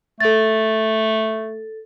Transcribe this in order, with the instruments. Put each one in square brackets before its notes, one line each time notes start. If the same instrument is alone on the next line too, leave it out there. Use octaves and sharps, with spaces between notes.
[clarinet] A3 [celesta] A4 A6